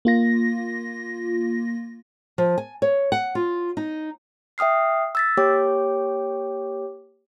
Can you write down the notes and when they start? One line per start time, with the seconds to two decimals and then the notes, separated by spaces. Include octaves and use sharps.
0.05 A#3 F4 A#6
2.38 F3
2.58 G#5
2.82 C#5
3.12 F#5
3.35 F4
3.77 D#4
4.58 E5 G5 D#6 F6 C7
5.15 E6 A6 B6
5.37 A#3 G4 C#5 G5 D6